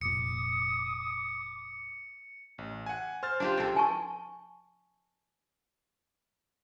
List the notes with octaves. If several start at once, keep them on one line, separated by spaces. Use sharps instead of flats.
F1 A#2 D6 D#6 C#7
A1
F#5 G#5
C5 F6 A6
D4 F4 G4
C#2 C4 A4
G#5 A5 C#6